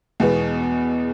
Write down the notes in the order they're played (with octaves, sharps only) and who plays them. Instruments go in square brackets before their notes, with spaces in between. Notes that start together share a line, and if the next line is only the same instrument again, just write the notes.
[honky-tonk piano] E2 B2 G#3 B3